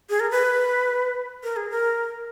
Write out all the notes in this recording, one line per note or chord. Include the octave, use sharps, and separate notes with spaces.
G#4
A#4
B4
A#4
G#4
A#4